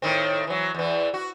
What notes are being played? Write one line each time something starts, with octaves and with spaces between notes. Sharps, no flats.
A2 D#3 C4
E3 F#3
E2 E3
F#4